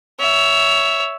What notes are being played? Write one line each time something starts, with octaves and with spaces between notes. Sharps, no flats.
C#5 E5